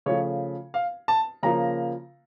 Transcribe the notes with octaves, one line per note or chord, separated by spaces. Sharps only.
C#3 F3 A3 C#5
F5
A5
C#3 F3 A#3 A#5